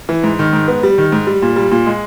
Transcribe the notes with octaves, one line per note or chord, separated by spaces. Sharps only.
E3
G#2
D#3
G#2
B3
G3
D#3
G#2
G3
A#2
G3
A#2
G#3